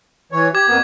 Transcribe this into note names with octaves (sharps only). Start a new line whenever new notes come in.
E3 C#5
G4 D6 G#6
F2 A#3 B3